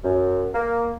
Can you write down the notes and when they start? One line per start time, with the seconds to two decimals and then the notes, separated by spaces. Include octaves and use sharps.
0.04 F#2
0.54 A#3